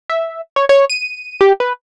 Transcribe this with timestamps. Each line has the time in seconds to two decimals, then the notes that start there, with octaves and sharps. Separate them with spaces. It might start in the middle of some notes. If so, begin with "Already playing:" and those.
0.10 E5
0.56 C#5
0.69 C#5
0.90 D#7
1.41 G4
1.60 B4